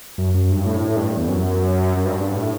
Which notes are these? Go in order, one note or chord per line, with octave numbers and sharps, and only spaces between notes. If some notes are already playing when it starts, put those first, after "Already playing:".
F#2
F#2
G2
A2
A2
G2
E2
F#2
F#2
G2
G2
A2